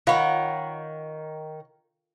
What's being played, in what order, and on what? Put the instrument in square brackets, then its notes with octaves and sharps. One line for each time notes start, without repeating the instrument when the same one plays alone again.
[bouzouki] D#3 [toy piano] F4 F5 B5 [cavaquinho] C#5 F#5